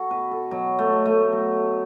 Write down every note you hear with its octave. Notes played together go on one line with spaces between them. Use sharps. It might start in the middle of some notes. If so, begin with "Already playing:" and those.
Already playing: F#4 A4
B2 B4
A4
B2 F#3
A3
B2
A3
F#3